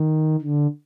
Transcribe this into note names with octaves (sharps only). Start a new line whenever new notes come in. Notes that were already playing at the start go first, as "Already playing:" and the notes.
Already playing: D#3
D3